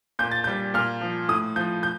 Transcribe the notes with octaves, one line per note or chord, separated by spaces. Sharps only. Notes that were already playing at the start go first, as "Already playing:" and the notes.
A#2 G6
A6
G3 G6
A#2 F6
F3
A2 D#6
F3 G6
G6